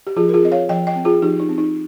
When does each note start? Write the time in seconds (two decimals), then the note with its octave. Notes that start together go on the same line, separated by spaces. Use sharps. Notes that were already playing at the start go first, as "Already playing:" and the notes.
0.07 G4
0.16 F3 F4 G#4
0.29 A#4
0.34 F4 G#4
0.43 C4 D#5
0.52 C#5 F5
0.69 F3 D#5 G5
0.87 D#5 G5
0.96 C4
1.05 F4 G#4
1.22 F3 D#4 G4
1.40 D#4
1.49 C4
1.58 D#4